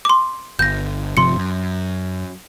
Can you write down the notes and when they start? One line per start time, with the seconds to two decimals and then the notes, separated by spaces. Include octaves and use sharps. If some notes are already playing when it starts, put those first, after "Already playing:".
0.05 C6 D6
0.59 G1 G6 A#6
1.17 G1 C3 F3 C6 C#7
1.37 F#2